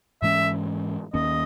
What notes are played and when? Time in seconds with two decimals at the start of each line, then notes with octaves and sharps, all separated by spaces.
0.22 G#2 E3 G#3 C#4 E5
1.14 D#2 D#3 A#3 C#4 D#5